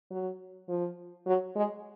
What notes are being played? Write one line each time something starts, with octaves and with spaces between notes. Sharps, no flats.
F#3
F3
F#3
G#3